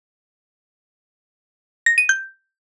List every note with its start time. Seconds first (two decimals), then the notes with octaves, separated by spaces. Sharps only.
1.86 A#6
1.98 D#7
2.09 G6